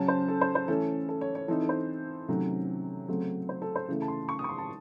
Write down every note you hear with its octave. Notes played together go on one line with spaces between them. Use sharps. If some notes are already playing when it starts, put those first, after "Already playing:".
Already playing: C#3 F#3 C#4 A5
C5
A4
C5
C5
E3 A3 C#4 A4
A4
C#5
C#5
E3 C4 D#4 A4
A4
C5
C3 D#3 F#3 A3 C#4
C#3 F#3 A3 C4
C5
A4
C5
C#3 E3 A3
A5
C6
C#6
D#6
C#6
C6
A5